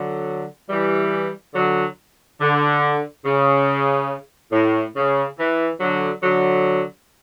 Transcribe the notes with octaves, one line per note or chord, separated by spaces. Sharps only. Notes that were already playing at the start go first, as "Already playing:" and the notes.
Already playing: D3 F#3
E3 G3
D3 F#3
D3
C#3
A2
C#3
E3
D3 F#3
D3 F#3